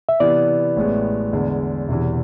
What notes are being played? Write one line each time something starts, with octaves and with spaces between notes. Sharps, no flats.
E5
C3 E3 B3 E4 D5
A1 A2 G#3 B3
E2 D3 G#3
E1 E2 C3 E3